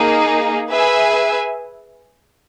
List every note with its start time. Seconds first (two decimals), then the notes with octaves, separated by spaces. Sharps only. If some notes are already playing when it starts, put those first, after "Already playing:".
Already playing: A#3 D#4 G#4
0.70 G#4 B4 E5 G#5